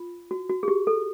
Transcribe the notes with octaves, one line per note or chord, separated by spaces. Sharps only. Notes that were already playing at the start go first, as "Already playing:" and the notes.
Already playing: F4
F#4
F#4
G#4
G4
A4